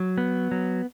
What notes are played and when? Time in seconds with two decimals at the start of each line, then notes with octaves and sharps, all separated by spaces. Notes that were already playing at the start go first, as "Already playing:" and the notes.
Already playing: F#3
0.18 B3
0.51 F#3